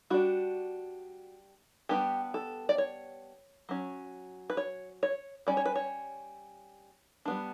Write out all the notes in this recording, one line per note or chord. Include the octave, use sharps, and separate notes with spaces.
G3 D4 F#4
G3 B3 D4 G4
A4
D5
C#5
F#3 C#4
B4
C#5
C#5
G3 C#4 D5
C#5
B4
C#5
G3 B3 D4